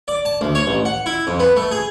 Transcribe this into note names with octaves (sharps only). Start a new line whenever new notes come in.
D5
A5
D2
C#5
A1
F#5
E4
F2
B3
A3
G#4